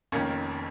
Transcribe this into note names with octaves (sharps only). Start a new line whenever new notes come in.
F1 F2 D#3 A#3 C#4